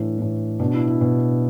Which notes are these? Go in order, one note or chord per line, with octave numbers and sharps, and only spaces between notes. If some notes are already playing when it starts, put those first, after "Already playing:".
Already playing: A2 E3 D4
A2 E3
B2 D4
E4
E4
B2